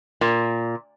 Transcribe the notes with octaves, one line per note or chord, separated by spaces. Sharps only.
A#2